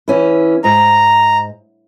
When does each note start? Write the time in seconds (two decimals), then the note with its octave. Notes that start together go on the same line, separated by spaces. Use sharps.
0.08 E3 C#4 E4
0.64 G#2 A#5